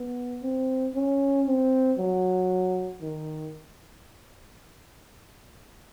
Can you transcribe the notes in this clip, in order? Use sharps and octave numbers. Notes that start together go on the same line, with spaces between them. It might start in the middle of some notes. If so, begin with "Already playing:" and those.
Already playing: B3
C4
C#4
C4
F#3
D#3